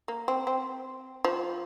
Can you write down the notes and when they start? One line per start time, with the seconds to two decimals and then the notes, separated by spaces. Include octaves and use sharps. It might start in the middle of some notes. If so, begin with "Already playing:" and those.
0.08 A#3
0.28 C4
0.47 C4
1.25 F3